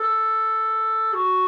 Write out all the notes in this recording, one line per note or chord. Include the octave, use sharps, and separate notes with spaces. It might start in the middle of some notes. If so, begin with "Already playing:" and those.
Already playing: A4
F#4